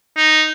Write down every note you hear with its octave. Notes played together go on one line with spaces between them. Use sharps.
D#4